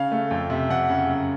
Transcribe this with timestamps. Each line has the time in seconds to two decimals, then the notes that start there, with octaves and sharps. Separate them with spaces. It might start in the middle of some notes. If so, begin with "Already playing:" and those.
Already playing: C#3 F5
0.12 A3
0.31 F2
0.50 C3
0.69 F2 F#5
0.89 C#3
1.09 F#2